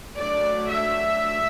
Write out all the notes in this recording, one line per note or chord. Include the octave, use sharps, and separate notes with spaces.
F#3 A3 D4 D5
E5